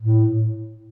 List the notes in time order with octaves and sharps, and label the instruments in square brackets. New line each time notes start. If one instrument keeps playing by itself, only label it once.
[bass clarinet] A2